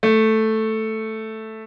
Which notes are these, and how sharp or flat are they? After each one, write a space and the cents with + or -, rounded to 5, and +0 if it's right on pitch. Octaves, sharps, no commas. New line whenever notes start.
A3 +0